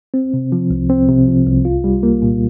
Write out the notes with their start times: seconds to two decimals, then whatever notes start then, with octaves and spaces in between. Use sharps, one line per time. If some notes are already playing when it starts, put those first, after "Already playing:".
0.14 C4
0.34 C3
0.52 F3
0.70 C2
0.90 C4
1.09 C3
1.28 F3
1.46 C2
1.65 F4
1.84 G3
2.03 A#3
2.22 A#2